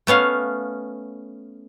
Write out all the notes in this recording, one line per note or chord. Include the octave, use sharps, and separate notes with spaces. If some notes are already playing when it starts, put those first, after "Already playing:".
A3 B3 C#4 F5